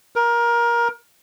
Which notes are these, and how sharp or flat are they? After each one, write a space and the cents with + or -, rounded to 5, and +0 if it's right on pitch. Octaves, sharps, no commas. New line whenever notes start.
A#4 +20